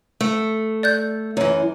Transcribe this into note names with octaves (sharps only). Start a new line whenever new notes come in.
A3
D5 F#6 G6
F#2 E3